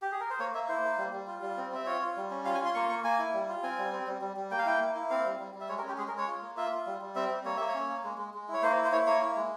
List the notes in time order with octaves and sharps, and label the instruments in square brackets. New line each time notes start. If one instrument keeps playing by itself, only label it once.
[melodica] G4
G#4
A#4
C5
A#3 C#5
A#3 E5
E4 C5
A#3
G3
G3
F4
G3
C4
C4 E5
F4 C#5
F4
G3
C#4
F4 F5
G#5
F4
C6
A#3 C#6
A#3 C#6
A#3 G#5
E4
G3
F4
C4 G#5
G3
C4
G3
G3
G3
A#3 G5
F5
E4 G5
A#3
E4
C4 F5
G3
G3
G3
E5
G#3 C#5
A#4
C#4
G4
G#3 G#4
A#4
G#3
C#5
F4
A#3
F4 E5
F4
G3
G3
C4 E5
G3
A#3 C#5
A#3 E5
C#5
C#4
A#3
G#3
G#3
G#3
E4
C#5
A#3 C5
E4
C5
E4 C#5
A#3 C#5
E4
G#3